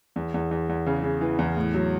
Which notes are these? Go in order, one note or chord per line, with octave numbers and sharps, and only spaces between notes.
E2
E2
E2
E2
C#3
C#3
E3
E2
A2
F#3